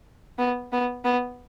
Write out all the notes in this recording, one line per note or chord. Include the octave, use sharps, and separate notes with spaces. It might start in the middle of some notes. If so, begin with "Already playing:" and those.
B3
B3
B3